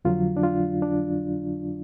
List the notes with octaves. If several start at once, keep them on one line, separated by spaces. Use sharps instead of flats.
F2 D3 F#3 F4
D4
F4
D4